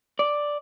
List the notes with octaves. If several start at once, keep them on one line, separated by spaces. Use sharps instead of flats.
D5